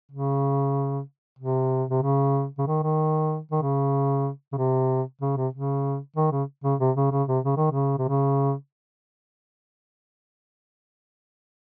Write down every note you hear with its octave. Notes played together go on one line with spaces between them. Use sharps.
C#3
C3
C3
C#3
C#3
D#3
D#3
D#3
C#3
C#3
C3
C#3
C3
C#3
D#3
C#3
C#3
C3
C#3
C#3
C3
C#3
D#3
C#3
C3
C#3